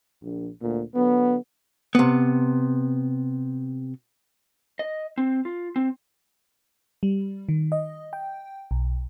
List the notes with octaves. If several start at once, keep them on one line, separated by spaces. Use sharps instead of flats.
A#1
D2 A#2
D3 F#3 B3
C3 B3
D#5
C4
F4
C4
G3
D#3
D#5
G5
B1